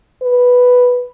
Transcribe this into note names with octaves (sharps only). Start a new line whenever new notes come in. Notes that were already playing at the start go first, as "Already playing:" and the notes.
B4